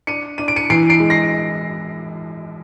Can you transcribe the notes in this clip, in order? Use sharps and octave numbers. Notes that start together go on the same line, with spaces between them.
D4 C#7 D#7
D4 D#7
D7
C#7 D#7
E3 C7 D7
C7 D7
G#3
A#6 C7